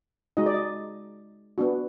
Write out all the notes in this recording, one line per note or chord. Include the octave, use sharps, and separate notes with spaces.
G#3 D#4 F#4 D#5
D5
D#5
B3 D4 F#4